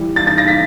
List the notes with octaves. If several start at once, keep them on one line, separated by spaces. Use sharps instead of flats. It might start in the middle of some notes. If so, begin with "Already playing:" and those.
Already playing: E3 G3
A6
A6
A#6
B6